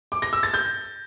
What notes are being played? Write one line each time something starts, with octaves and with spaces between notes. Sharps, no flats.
D6
A#6
E6
A6
G6